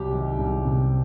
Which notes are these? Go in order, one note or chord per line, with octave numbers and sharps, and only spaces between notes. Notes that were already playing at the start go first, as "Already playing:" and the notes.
Already playing: C2 C3 F#3 G4
D#3
C2
C3